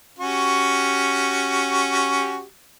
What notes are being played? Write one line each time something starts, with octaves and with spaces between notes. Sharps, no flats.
C#4 F#4 G4